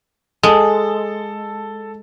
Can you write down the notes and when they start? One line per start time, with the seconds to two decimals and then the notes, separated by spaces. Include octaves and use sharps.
0.43 G#3 A4 A5